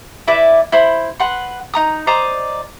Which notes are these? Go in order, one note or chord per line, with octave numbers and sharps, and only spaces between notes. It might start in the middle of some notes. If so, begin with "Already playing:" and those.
E4 B4 D5 E5
E4 C5 B5
B4 F#5 C6
D#4 A#5 D#6
C5 D5 D#5 A#5